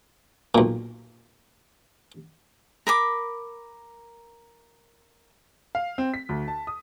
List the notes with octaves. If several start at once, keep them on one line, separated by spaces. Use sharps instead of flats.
B1 A#2
A#4 B5 D6
F5
C4
B6
D2
A5
D#6